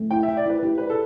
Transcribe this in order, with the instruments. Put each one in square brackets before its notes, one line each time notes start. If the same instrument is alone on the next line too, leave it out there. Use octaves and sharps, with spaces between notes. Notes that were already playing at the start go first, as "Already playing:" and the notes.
Already playing: [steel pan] A3
[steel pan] E4 [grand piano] G5
[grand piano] E5
[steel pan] G5
[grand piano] D5
[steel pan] E4 [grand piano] B4
[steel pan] E4 [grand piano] G4
[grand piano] B4 [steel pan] D5
[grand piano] A4